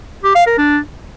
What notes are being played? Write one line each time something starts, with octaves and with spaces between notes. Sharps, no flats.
G4
F5
A#4
D4